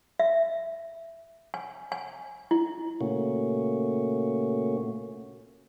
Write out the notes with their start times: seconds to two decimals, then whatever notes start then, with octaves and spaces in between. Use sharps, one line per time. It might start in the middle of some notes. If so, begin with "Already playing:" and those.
0.19 E5
1.54 G#5
1.92 G#5
2.51 E4
3.01 A#2 C#3 A3 A#3 C#4 F#4